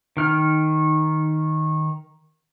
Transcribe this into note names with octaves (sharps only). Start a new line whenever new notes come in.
D#3 F6